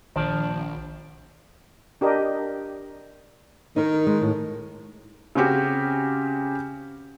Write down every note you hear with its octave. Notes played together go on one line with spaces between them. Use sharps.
A#1 D#3 F3 D4
D4 G4 A#4 D#5
D#3 D#4 A#4
G#3
A2
C#3 C4 C#4 F#4 G4